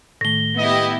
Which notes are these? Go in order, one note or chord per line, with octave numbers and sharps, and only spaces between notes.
A2 D#3 A3 A#6 G7
B3 E4 G4 D#5